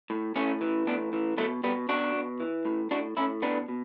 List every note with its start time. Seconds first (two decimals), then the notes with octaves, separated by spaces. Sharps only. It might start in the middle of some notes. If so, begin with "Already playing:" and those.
0.10 A2
0.36 A2 A3 C#4
0.61 E3
0.87 A2 B3 D4
1.13 E3
1.37 B2 F#3 A3
1.64 B2 G3 B3
1.89 B2 D4 F#4
2.16 B2
2.40 E3
2.65 A2
2.91 A2 D4 F#4
3.17 A2 C#4 E4
3.42 B2 B3 D4
3.68 B2